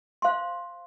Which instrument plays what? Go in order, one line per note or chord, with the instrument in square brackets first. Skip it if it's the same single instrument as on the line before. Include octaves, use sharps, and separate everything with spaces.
[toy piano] C5 F5 C6